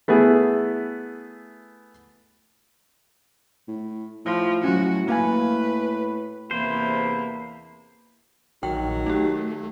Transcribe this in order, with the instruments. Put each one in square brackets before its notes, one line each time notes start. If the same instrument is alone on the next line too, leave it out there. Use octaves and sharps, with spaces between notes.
[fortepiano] A3 B3 E4 G#4
[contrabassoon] A2
[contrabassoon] A2 [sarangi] F3
[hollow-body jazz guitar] F#3 C#4 [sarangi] F#4
[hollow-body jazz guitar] A#3 F5 G#5 [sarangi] B4
[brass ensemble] E2 C3 E3 [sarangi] A#3 [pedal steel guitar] C5 [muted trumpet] B5
[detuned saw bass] A#1 [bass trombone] D#3 [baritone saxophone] F#3 [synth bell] G5
[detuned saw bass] A3 [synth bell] D#4 G4